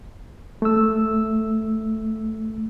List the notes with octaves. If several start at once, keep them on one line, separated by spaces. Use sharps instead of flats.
A3 E6